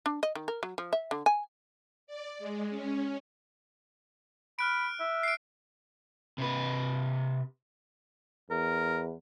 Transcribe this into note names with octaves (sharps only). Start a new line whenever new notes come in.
D4
D#5
D#3
A#4
F#3
F3
E5
D3
G#5
D5
G#3
C#4
B5 F6 F#6 D7
E5
C7 D7
C3 B4
E2 A#4